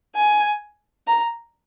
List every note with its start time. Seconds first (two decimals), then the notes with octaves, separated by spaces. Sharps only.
0.15 G#5
1.07 A#5